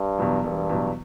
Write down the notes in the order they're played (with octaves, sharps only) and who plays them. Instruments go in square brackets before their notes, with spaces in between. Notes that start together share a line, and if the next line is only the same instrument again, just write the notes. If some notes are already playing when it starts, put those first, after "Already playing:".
Already playing: [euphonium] G2
[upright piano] E2 B2 F#3
[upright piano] E1 [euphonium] G2
[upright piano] E2 B2 F#3